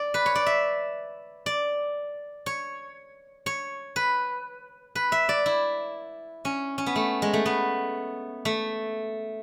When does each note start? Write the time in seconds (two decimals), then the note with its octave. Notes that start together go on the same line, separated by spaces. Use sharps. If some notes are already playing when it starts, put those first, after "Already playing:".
Already playing: D5
0.14 B4
0.26 C#5
0.35 D5
0.46 E5
1.46 D5
2.46 C#5
3.46 C#5
3.96 B4
4.95 B4
5.12 E5
5.29 D5
5.46 E4
6.45 C#4
6.78 C#4
6.86 B3
6.96 A3
7.22 G#3
7.33 A3
7.46 B3
8.45 A3